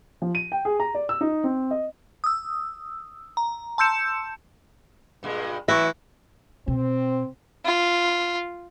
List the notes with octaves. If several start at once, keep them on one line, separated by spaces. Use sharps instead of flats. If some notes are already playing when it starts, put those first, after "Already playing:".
F3
D#7
G5
G#4
A#5
D5
E6
D#4
C4
D#5
D#6 E6
A#5
A5 C6 E6 G6 C#7 E7
G2 A#2 G#3
E3 F#3 E5 C#6 A#6
B2 C4
F4